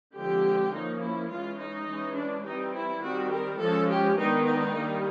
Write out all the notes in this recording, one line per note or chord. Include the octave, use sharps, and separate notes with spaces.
D3 F3 G#3 C4 G4
F3 A#3 C#4 D#4
E4
E3 G#3 C#4 F4
D#4
E3 G#3 C#4
D4
E3 G3 C4 D#4
E4
D#3 G3 C4 F#4
A#4
F3 G#3 C#4 A4
G4
D#3 G#3 B3 D4 D#4
D#4
D#3 G3 A#3